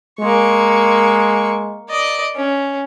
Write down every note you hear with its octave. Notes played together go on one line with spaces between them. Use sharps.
G#3 A#3 C#6
D5 D#5
C#4